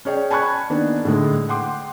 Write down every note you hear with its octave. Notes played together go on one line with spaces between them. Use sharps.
C#4 G#4 C#5 D5 G5
G#5 A5 B5 C#6 F#6 G#6
D#3 A#3 B3 D4
A2 D3 G#3
F#5 G5 C6 D6